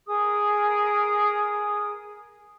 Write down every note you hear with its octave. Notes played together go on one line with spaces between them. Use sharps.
G#4 A#4 D#6